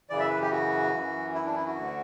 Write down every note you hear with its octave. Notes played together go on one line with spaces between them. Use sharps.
F#2 C#3 E3 D5
E5
B4
G4
F#4
F#2 E3
E4
D4
E4
F#4
D2 D3